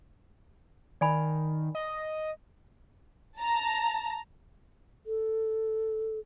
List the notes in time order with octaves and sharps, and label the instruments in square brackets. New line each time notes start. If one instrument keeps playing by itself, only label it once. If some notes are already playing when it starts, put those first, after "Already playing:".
[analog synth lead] D#3 [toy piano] D5 G#5 B5
[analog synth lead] D#5
[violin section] A5 A#5
[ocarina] A4